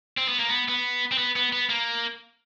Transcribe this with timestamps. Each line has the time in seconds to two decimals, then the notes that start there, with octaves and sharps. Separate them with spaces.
0.18 C4
0.29 B3
0.39 A#3
0.49 B3
0.69 B3
1.12 C4
1.19 B3
1.36 B3
1.52 B3
1.69 A#3